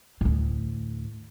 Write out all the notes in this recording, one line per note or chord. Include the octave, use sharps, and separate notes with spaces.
D2 A2